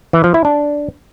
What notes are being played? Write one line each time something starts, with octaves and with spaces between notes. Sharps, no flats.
E3
F3
E4
D4